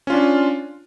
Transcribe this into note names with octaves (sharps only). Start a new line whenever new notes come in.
C#4 D4 F4